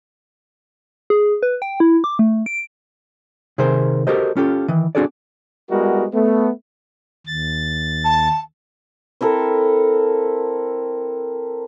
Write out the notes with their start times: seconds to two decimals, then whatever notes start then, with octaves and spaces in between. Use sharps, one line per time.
1.10 G#4
1.43 B4
1.62 G5
1.80 E4
2.04 D6
2.19 A3
2.46 D7
3.58 C3 D#3 G#4 A#4 C5
4.07 F#4 G4 A4 A#4 C5 D#5
4.37 C#4 F4 G4 A4
4.68 D#3 E3
4.95 C4 D4 F#4 G#4 A4 D5
5.70 G3 G#3 B3 E4 F#4 A#4
6.13 A3 B3
7.27 D#2 A6
8.04 A5
9.21 C4 E4 A4 A#4